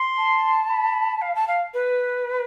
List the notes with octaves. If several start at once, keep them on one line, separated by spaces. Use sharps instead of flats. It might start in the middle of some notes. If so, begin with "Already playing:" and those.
Already playing: C6
A5
B5
F5
A5
F5
B4